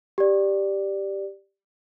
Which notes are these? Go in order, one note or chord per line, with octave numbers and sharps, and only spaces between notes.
G4 D5